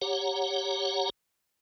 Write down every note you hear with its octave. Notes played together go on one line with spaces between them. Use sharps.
G4 C#5 F#5 A#5